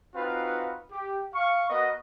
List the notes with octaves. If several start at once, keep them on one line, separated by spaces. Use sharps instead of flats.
C4 D#4 F4 F#4 B4 F5
G4
F5 C#6
B3 F#4 A#4 D#5